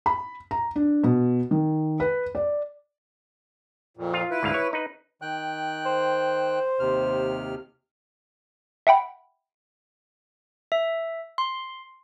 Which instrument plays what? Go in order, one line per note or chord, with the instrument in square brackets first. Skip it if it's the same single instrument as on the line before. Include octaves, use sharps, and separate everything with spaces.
[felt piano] B5
A#5
D4
B2
D#3
B4
D5
[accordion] F2 A#2
[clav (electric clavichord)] F4 F5
[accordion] E4 B4
[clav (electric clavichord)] D2 G#2 F5
C#5
D#4 B4
[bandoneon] D#3 G5 F#6
[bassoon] C5
[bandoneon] D#2 C3 F6
[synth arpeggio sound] E5 F#5 G5 B5
[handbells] E5
C6